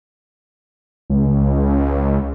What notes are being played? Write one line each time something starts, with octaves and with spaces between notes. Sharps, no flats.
C#2